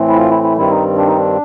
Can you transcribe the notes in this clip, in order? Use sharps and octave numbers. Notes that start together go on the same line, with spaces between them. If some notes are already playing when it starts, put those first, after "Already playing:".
Already playing: A2 E3 A3 C4
E4
F4
E4
E4
G2 D#3 G3 C4 E4
D#4
D4
D#4
D4